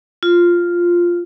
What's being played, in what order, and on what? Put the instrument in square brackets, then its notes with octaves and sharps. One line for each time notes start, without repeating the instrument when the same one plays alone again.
[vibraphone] F4